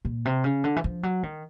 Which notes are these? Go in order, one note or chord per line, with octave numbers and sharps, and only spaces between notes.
A#2
C3
C#3
D3
E3
F3
F#3
D#3